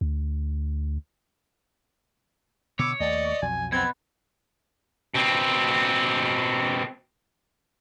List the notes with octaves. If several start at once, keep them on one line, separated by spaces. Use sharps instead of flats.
D2
B2 D3 B3 C#5 D6 E6
D#2 A3 D5 D#5
B1 F2 F#3 G#5
B2 B3 C4 G#6
B2 C4